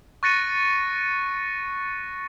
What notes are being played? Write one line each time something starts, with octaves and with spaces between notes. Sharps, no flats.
C#6 F#6 A6 A#6 C#7 D#7